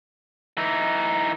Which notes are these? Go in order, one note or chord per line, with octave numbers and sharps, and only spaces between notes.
E3 D#4